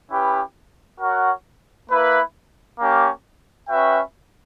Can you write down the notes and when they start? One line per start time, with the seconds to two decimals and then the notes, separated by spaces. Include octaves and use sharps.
0.09 C#4 E4 G4 B4
1.00 F#4 A#4 C#5 F#5
1.89 A#3 E4 B4 E5
2.79 A#3 C#4 G4
3.68 C#4 F#4 B4 E5 G5